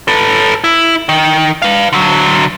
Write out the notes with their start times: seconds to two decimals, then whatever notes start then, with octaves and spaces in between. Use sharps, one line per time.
0.08 A4 B4
0.64 E4
1.09 D#3
1.62 B4 F5
1.93 D3 F#3